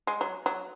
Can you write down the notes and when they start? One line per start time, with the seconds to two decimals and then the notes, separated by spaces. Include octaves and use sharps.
0.07 G#3
0.21 F#3
0.46 F#3